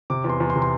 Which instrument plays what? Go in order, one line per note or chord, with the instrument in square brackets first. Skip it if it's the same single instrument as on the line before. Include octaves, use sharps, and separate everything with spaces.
[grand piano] C3 D6
E2
C6
E2
C6
C3
C6